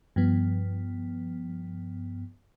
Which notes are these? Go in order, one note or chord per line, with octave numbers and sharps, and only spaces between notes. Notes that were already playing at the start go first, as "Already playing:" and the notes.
G2 F3 B3